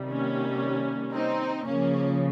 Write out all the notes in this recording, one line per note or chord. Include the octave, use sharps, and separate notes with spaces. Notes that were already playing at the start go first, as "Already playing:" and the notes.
Already playing: C3 D#3 G3
A#3 C#4
C4 D#4
C#3 F3 A#3 C#4